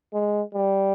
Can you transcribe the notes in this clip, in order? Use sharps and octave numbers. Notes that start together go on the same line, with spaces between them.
G#3
G3